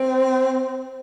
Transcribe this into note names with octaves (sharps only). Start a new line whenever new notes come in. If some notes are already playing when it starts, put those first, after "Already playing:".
Already playing: C4